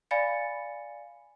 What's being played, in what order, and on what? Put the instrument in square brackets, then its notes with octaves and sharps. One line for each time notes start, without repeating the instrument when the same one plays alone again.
[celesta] D5 F5 G#5 B5 A6 C#7